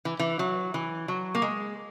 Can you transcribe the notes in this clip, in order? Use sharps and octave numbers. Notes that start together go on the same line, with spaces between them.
E3
E3
F#3
E3
F#3
A#3
G#3